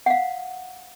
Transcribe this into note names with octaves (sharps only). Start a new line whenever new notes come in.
F5 F#5